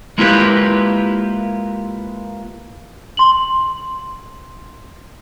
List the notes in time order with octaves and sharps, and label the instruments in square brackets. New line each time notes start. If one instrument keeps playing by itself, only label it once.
[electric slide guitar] G#3 A#3 E4 F4 G4 B4
[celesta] C6 F#7